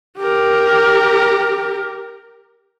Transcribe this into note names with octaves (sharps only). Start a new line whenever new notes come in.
G4 A#4